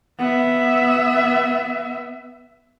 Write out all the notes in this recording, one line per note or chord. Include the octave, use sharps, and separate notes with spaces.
B3 E5